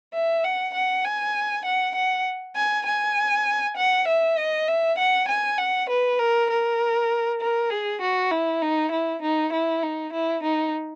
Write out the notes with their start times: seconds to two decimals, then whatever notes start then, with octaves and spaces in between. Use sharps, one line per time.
0.14 E5
0.44 F#5
0.74 F#5
1.05 G#5
1.66 F#5
1.96 F#5
2.56 G#5
2.86 G#5
3.77 F#5
4.08 E5
4.38 D#5
4.68 E5
4.99 F#5
5.29 G#5
5.58 F#5
5.90 B4
6.19 A#4
6.50 A#4
7.41 A#4
7.71 G#4
8.02 F#4
8.31 E4
8.62 D#4
8.92 E4
9.22 D#4
9.53 E4
9.83 D#4
10.13 E4
10.43 D#4